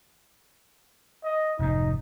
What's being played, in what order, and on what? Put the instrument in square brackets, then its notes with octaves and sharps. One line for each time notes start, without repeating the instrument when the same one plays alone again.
[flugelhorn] D#5
[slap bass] F1 G#2 [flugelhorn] D#4